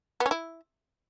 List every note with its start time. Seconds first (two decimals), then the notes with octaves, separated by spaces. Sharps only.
0.20 B3
0.26 C#4
0.31 E4